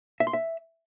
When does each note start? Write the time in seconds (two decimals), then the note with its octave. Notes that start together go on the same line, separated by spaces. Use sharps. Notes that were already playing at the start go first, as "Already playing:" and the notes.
0.20 E5
0.27 C6
0.33 E5